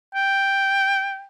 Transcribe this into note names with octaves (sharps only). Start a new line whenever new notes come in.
G5